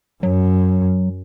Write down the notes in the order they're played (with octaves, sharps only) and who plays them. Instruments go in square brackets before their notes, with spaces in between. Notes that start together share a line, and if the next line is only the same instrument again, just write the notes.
[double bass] F#2 [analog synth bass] F#3